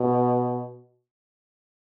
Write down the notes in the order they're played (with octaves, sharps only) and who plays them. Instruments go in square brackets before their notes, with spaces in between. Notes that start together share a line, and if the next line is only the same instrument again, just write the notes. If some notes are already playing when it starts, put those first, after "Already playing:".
Already playing: [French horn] B2